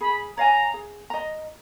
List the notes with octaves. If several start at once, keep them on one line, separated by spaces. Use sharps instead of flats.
G#4 B5
C#5 F5 G#5 A#5
G#4
D#5 A#5